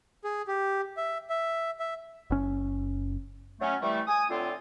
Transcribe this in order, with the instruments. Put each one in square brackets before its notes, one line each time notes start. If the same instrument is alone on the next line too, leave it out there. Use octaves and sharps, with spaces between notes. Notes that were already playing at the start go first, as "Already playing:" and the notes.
[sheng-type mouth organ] G#4
G4
E5
E5
E5
[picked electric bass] F#1 C#4
[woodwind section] F#3 A3 C#4
C3 E3 G3 A3
G#5 D#6
A2 D3 C4 F4